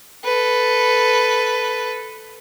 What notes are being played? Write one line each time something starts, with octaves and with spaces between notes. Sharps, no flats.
A4 B4